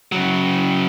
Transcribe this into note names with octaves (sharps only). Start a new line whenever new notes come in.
C#3 F#3